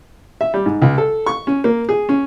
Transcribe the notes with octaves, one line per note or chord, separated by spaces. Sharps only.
E5
G3
G#2
C#2
A4
C#6
C#4
A#3
G#4
C#4